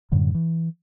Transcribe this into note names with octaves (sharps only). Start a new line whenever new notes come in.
F#2 A2 D3 G3
E3